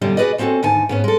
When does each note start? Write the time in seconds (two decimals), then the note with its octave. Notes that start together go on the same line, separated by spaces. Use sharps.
0.01 F#2 B2 D3 G3
0.17 F#4 G#4 A#4 B4 D5 D#5
0.38 F3 C4 C#4 D#4 F#4 A4
0.63 D2 G#2 D#3 G#5 A5
0.89 G#2 B3 C#4
1.04 G#3 A4